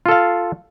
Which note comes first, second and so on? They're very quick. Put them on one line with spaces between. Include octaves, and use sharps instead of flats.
F4 A4 F5